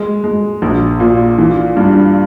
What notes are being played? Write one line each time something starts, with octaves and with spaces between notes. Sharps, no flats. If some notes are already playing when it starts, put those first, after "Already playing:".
Already playing: G#3
G#3
A#1
A#2
E3
G2